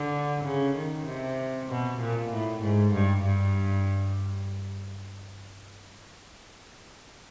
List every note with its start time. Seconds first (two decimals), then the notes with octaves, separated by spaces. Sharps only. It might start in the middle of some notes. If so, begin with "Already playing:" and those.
Already playing: D3
0.44 C#3
0.75 D#3
1.06 C3
1.69 B2
2.00 A#2
2.32 A2
2.62 G#2
2.93 G2
3.25 G2